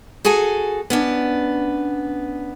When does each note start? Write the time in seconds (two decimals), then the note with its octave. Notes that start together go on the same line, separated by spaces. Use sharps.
0.25 F#4 G#4 A4 G#5
0.90 B3 C#4 D4